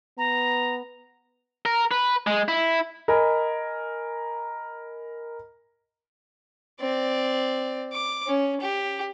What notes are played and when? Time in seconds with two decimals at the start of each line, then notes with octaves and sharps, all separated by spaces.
0.18 B3 A#5
1.66 A#4
1.91 B4
2.27 G#3
2.48 E4
3.08 A#4 D#5 G#5 B5
6.80 C4 D5
7.92 D6
8.27 C#4
8.61 G4